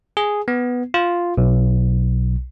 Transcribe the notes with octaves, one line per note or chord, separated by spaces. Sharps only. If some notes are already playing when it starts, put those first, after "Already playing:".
G#4
B3
F4
B1